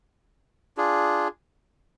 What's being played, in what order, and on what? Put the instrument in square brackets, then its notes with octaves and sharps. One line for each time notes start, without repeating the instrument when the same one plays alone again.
[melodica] D4 F4 G#4